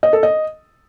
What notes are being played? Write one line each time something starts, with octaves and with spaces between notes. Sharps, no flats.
D#5
A4
D#5